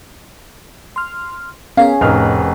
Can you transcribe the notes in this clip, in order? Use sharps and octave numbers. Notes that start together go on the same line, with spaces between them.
C6 F6
B3 C#4 G#4 A#4 F5
F1 A2 D#4 A#4 B4 F6